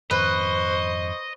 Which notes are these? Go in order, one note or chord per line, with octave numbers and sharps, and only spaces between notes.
F2 G#2 D#3 B4 C5 D#5 C#6